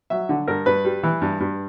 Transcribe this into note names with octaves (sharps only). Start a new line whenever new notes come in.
F#3 E5
D3
G2 A#4
G2 B4
G3
E3
G2
G2